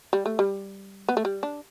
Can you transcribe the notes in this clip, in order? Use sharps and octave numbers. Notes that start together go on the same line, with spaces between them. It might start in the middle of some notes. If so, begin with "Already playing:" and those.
G3
A3
G3
B3
A3
G3
D4